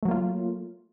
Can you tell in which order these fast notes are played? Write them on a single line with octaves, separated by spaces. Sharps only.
A3 F#3 A#3 F4